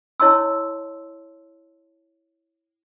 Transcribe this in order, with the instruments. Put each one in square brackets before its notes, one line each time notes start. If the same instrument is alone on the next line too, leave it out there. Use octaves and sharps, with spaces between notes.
[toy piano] E4 C#5 D#5 A5 C6 E6